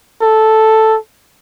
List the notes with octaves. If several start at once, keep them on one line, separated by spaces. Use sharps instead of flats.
A4